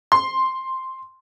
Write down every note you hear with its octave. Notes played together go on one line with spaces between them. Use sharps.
C6